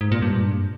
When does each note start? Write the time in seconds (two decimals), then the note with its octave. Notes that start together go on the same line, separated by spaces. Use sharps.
0.01 G#2
0.12 A#2
0.22 G2